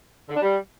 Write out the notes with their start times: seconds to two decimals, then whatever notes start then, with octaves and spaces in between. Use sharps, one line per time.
0.29 D3
0.36 D4
0.42 G3